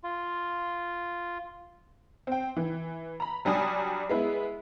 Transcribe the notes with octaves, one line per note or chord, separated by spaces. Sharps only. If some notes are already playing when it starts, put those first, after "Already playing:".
F4
C4 G5
E3
A#5 B5
F#3 G3 D4 G#5 D#6
G#3 B3 E4